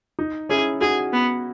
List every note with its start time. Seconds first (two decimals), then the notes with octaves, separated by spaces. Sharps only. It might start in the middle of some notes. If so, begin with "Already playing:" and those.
0.19 D#4
0.49 C#4 E4 G#4
0.81 D#4 F#4 G#4
1.13 B3